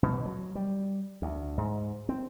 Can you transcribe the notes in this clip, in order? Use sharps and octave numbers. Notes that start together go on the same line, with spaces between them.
B2
F#3
G3
D2
G#2
C4